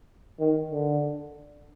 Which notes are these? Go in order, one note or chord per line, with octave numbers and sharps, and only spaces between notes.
D#3
D3